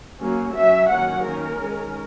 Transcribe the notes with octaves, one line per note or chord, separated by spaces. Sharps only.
F#3 A#3 C#4
F#3 C#4 E5
D#3 F#3 A#3 C#4 F#5
D#3 A#3 C#4 A#4
D#3 G#3 C#4